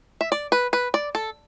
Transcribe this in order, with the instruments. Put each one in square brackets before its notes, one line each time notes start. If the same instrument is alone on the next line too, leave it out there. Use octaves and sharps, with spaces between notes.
[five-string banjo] E5
D5
B4
B4
D5
A4